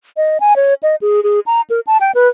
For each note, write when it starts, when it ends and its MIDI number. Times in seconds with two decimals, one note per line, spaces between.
0.17 0.38 75
0.40 0.56 80
0.56 0.74 73
0.83 0.96 75
1.02 1.23 68
1.23 1.40 68
1.46 1.61 82
1.70 1.80 70
1.87 1.97 81
2.01 2.11 79
2.15 2.29 71